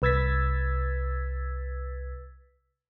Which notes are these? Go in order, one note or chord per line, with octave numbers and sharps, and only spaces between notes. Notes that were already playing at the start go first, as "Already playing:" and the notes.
C2 B4 E6 G#6 A6 B6